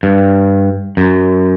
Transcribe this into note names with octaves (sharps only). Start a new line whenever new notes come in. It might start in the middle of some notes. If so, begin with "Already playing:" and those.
G2
F#2